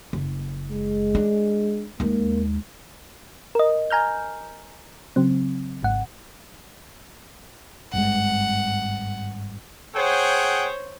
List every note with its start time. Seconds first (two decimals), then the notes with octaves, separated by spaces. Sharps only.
0.13 F#1
0.69 G#3
1.15 D4
2.00 D#2 G#3 A#3
3.55 A#4 D#5
3.90 G#5 A#5 F6 G6
5.16 C#3 F#3 C4
5.83 G#1 G#2 F#5
7.93 G#1 G2 G#3 F#5
9.95 G#4 C5 C#5 F#5 G5